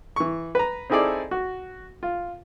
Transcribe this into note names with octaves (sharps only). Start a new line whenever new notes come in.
E3 C#6
B4 A#5
C4 D#4 E4 G#4 A4 D5
F#4
F4